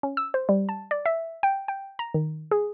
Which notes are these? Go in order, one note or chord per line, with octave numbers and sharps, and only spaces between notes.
C#4
E6
C5
G3
A5
D5
E5
G5
G5
A#5
D#3
G#4